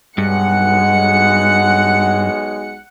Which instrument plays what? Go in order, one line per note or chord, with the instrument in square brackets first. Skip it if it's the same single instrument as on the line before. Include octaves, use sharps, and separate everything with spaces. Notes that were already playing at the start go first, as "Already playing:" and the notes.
[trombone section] B1 G#3 [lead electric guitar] G2 [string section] F#5 C#7